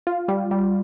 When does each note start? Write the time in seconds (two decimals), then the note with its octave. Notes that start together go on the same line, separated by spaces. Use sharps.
0.07 F4
0.28 G3
0.51 G3